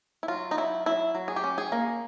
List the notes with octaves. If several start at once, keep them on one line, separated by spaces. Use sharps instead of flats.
E4
F#3 F4
D#4
F#3 E4
F#3 E4
F#3
G#4
G4
C#4
G#4
A#3